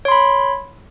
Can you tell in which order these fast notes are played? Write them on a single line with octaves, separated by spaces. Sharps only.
C#5 C6 B5